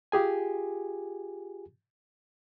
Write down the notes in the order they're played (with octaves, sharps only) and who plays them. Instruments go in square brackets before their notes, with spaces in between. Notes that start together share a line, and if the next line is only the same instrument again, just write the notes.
[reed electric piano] F4 G4 G#4 G#5